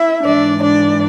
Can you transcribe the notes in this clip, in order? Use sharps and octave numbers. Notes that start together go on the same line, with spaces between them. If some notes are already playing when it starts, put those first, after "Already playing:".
Already playing: E4 E5
G#2 E3 D4 D5
D4 D5